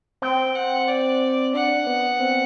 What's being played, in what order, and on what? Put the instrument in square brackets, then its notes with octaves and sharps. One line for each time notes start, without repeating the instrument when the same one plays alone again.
[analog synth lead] C4 [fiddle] G5
[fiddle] F#5
D5
[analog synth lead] D4 [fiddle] F#5
[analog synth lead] B3
C4